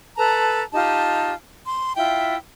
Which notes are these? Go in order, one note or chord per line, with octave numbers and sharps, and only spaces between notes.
A4 B4 A5 A#5
D#4 F4 G4 A5
C6
E4 F4 E5 G5